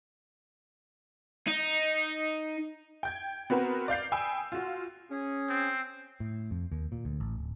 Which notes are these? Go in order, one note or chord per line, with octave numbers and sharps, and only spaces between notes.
D#4
G5 G6 G#6
B3 C4 F#4 A#4 B4
D5 F5 G6 C7
G5 G#5 B5 D#6 E6
F4 F#4
C#4 G#4
C4
A2
F2
D#2
A#2
D2
A1
D1